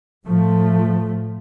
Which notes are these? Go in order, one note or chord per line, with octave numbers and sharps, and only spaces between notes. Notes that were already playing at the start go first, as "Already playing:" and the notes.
A2 F3 A3